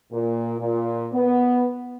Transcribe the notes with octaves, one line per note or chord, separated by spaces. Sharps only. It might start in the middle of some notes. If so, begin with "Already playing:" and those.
A#2
A#2
B3